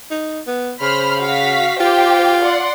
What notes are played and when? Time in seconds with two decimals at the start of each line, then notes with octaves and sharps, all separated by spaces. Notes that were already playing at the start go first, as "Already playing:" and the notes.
0.11 D#4
0.47 B3
0.81 C#3 C5 B5 F6
1.21 F#4 F5 B6
1.80 F4 G4 C5 G5
2.42 D5 F#5 C6